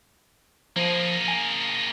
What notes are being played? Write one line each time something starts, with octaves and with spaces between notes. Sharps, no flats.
F3 A#3 G#4
G#5